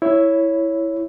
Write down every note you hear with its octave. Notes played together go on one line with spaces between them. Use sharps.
E4 C#5